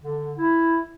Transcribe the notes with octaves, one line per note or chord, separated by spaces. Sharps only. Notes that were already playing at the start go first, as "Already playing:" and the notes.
D3
E4